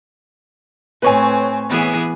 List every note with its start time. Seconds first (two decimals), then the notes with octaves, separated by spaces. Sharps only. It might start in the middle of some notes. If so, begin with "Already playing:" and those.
1.02 A2 C4 B4 C#5 G#5
1.69 E3 B3 G#4